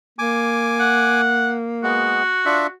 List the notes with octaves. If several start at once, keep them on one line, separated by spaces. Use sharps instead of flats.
A#3 G#5 D6
F#5
G#3 B3 F#4
D4 F4 E5